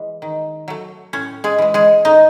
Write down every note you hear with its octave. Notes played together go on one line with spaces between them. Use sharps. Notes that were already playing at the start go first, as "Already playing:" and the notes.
Already playing: E3 G#3
D#3
F#3 A3
A2 C#4 C#5
G#3 G#4
E3 G#3
G#3 G#4
A2 D#4 D#5